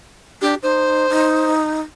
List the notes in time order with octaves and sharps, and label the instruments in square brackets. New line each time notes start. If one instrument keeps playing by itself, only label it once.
[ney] D4 [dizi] G4
[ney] D#4 [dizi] C5
[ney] D#4